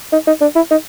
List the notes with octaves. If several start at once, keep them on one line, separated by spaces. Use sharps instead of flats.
D#4
D#4
D4
E4
D#4